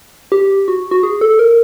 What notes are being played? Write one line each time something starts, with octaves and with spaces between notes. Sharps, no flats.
G4
F#4
F#4
G#4
A4
A#4